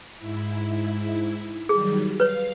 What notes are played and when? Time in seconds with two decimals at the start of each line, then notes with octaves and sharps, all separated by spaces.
0.18 G#2 E4
1.69 D#3 F#3 G3 G#4
2.20 B4 C#5 F5